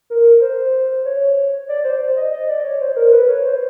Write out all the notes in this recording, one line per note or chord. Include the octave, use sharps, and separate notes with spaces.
A#4
C5
C#5
D5
C5
D#5
D#5
D5
C#5
C5
A#4
B4
C#5
C5